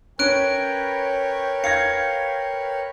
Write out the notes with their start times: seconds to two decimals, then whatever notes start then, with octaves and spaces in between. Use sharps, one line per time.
0.19 C#4 A#4 B4 C#5 G5 F#6 D7
1.64 F5 G#6 A#6 C#7